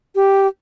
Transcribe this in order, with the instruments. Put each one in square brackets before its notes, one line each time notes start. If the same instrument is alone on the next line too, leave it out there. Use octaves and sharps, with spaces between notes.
[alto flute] G4